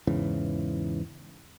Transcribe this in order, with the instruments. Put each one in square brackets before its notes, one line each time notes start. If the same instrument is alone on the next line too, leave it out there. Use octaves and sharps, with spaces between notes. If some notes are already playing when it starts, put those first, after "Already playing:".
[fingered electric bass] E2 G#2 C#3 E3